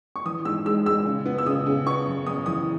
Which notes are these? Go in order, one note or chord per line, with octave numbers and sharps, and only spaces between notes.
C#6
E3 D#6
G#2 E6
G#3 E6
G#3 E6
C#3
B3
E6
C#3 D#6
C#3
B3 C#6
F#2
F#2 D#6
E3 D#6